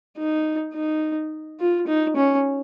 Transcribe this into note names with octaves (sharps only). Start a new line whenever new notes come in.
D#4
D#4
F4
D#4
C#4